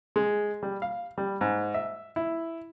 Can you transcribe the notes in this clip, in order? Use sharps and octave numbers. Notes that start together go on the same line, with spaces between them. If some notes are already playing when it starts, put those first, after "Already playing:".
G#3
G3
F5
G3
G#2
E5
E4